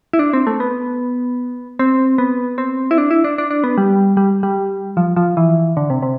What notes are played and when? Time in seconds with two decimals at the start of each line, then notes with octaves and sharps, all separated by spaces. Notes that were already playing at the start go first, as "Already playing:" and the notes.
0.13 E4
0.19 D4
0.33 C4
0.47 A3
0.60 B3
1.79 C4
2.18 B3
2.58 C4
2.91 E4
2.98 D4
3.11 E4
3.24 D4
3.38 D4
3.51 D4
3.64 B3
3.78 G3
4.17 G3
4.43 G3
4.97 F3
5.16 F3
5.37 E3
5.77 D3
5.90 C3
6.02 C3